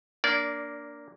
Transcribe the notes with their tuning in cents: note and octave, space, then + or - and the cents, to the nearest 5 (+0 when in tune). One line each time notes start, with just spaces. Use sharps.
A#3 +0 D4 +0 D5 -20